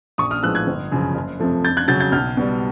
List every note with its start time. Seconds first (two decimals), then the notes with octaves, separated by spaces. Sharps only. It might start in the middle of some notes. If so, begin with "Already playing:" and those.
0.18 A#1 C#6 D#6
0.31 D#6 F6
0.43 A2 F3 G#3 B3 E6 F#6
0.55 F#6 G#6
0.67 G1
0.92 F#2 C#3 F3
1.15 F#1
1.40 F2 C3 F3 A3
1.64 F2 G6 A6
1.77 F#6 G#6
1.88 C#3 F#3 G6 A6
2.00 G6 A6
2.12 B1 F6 G6
2.37 B2 G3